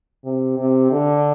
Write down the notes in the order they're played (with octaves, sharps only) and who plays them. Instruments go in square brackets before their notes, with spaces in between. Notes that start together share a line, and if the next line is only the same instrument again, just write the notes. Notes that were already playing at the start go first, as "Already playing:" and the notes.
[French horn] C3
C3
D3